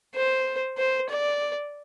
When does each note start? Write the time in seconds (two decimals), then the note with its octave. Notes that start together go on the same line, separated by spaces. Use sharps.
0.14 C5
0.78 C5
1.09 D5